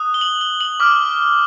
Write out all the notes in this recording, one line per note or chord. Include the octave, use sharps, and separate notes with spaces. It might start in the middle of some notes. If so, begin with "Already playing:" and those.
Already playing: D#6 F#6
G7
F#7
G7
F#7
D6 F6